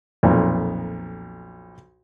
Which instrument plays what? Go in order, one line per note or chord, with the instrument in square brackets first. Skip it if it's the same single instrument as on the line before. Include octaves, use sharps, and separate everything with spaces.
[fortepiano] B1 F2 A#2